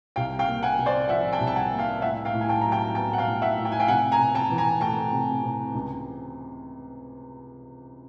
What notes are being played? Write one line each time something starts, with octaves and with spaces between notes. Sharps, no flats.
C2 F5 G5
F5 G5
A#3
F#5 G#5
C3
C5 D5
F3 E5 F#5
G5 A5
C2
A5
F#5 G#5
A#3
F5 G5
A2 E5 F#5
F5 G5
A2
G#5
G5 A5
F#3 A#5
G5 A5
B3 G5 A5
F#5
F5 G5
A2
E5 F#5
A2
G5
G#5
F5 G5
C3 F#5 G#5
G#5 A#5
C3
G5 A5
E3
G#5 A#5
A3 G5 A5
C3
C3
C#2